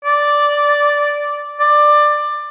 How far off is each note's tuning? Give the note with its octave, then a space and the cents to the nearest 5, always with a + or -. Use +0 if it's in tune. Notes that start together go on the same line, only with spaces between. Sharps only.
D5 -5
D5 +15